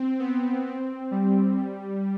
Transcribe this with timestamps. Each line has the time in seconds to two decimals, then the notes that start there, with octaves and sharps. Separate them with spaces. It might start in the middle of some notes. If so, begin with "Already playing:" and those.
Already playing: C4
0.19 B3
0.66 C4
1.11 G3
1.58 G3